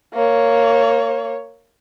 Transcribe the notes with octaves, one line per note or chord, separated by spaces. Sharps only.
A#3 C#5